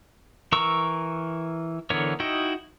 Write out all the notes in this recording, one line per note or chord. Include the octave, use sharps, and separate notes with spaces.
E3 A#4 A#5 C#6 E6
D3 E3 B3 A#4 C#5
D#4 E4 F#4 D#5 G5